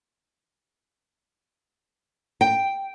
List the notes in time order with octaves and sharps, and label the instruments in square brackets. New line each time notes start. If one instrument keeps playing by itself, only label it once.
[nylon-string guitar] G5